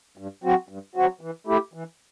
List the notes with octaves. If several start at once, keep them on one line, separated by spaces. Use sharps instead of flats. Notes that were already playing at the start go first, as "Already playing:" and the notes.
G2
F#3 C4 F#4
G2
F#3 C4 F#4
E3
A3 E4 G4
E3